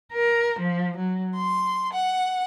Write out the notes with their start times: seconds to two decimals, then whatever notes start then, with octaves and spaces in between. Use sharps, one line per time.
0.13 A#4
0.59 F3
0.97 F#3
1.36 C6
1.94 F#5